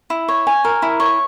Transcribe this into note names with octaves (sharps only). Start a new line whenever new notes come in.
E4
C#5
G#5
A#4
E4
C#5